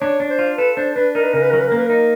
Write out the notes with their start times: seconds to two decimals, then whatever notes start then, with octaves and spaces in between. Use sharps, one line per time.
0.01 D4 C#5
0.20 D4
0.30 C5
0.39 F4
0.58 A4 B4
0.77 D4 C5
0.96 D4 B4
1.15 D#4 A#4
1.23 B4
1.33 C#3 A#4
1.42 B4
1.50 F#3 A#4
1.59 B4
1.67 A#4
1.72 A#3
1.77 B4
1.86 D#4 A#4